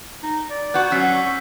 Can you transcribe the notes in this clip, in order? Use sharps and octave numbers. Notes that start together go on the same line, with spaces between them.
D#4
D5
B3 F#4 F#6 G6
F#3 C#4 E6 B6 C7